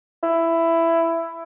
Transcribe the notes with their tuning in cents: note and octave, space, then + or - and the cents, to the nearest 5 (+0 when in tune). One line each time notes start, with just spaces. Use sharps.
E4 +10